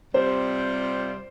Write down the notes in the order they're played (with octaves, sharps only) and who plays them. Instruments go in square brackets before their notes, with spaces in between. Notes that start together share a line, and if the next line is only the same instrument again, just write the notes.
[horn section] C3 G3 C4 F4 [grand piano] C5